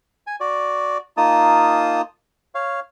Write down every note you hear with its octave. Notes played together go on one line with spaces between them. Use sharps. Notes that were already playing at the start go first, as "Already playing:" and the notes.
G#5
F#4 D5
A#3 D#4 F4 A5 D#6
C#5 F5